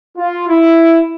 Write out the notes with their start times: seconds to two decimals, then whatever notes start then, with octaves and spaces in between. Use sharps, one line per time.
0.17 F4
0.48 E4